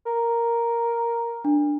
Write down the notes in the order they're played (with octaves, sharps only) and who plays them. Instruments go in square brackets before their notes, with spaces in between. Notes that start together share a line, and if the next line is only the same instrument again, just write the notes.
[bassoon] A#4
[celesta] D4